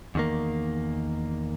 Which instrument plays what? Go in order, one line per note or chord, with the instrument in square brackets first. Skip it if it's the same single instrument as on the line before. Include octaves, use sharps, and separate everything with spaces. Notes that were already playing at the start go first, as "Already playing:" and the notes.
[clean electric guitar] E2 D#3 A#3